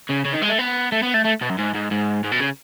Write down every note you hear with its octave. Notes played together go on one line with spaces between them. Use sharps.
C#3
C#3
D#3
G#3
A3
B3
A3
B3
A3
A3
B2
F#2
G#2
G#2
G#2
G#2
B2
C#3